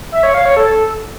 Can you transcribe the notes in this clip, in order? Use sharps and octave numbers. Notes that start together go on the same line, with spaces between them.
E5
C#5
F5
C#5
A4